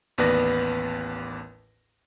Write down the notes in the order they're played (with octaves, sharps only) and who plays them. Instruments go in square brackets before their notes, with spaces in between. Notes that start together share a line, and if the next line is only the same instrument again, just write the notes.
[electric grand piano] A1 D#2 B3 B4 D5 A#6